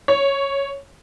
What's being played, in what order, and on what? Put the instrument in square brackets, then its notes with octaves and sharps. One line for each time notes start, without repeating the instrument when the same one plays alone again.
[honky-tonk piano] C#5